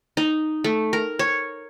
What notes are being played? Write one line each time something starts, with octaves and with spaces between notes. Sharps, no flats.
D#4
A3
A#4
C#5